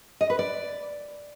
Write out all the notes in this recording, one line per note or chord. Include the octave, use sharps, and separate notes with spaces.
D#5
B4
D5